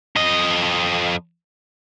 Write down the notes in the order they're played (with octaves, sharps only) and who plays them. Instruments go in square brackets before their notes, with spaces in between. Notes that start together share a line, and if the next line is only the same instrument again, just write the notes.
[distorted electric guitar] F2 D#5